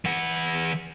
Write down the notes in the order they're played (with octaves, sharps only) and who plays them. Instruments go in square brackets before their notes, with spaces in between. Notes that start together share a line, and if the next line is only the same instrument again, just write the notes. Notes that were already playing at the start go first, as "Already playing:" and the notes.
[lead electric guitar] E3 F#5